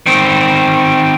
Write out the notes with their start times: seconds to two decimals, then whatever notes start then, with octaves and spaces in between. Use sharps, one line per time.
0.06 D#3 C4